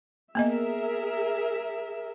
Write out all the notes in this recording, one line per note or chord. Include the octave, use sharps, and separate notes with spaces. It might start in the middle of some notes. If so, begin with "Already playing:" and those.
A#3 B3 G#4 A#4 D#5 E5